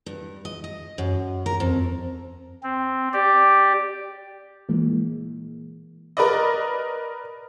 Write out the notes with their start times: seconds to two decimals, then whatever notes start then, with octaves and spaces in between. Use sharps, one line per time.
0.06 G2
0.45 D#5
0.64 D#5
0.98 F#2
1.46 A#4
1.60 F2
2.63 C4
3.13 G4 D5
4.69 A#2 E3 G#3 A#3
6.17 A#4 B4 D5 D#5